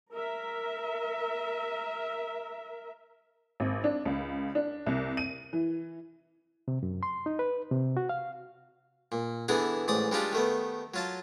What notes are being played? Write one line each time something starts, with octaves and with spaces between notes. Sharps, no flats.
A#4 E5
G#1
D4
C#2
D4
C2
D#7
E3
C3
F#2
C6
D#4
B4
C3
F#4
F5
A#2
D3 E3 B3 D4 G#4
A1 G#2 D5 D#6
G3 G#3 D4 D#4 F4 G4
D#3 A3 B3
F#3 F4 A5